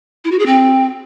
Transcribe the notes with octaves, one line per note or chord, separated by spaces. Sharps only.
E4
F#4
G#4
C4